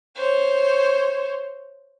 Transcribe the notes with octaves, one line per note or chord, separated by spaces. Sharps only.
C5 C#5